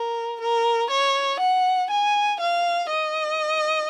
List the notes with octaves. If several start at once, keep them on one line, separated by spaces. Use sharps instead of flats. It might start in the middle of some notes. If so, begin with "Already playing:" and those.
Already playing: A#4
A#4
C#5
F#5
G#5
F5
D#5